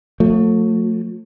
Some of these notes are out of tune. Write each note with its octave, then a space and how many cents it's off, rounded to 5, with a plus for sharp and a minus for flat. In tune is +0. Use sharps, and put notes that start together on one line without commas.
F3 +45 A3 +20